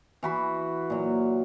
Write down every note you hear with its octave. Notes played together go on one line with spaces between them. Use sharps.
E3 F#4 B5
A#2 F#3